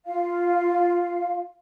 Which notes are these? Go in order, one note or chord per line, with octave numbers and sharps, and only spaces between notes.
F4 F5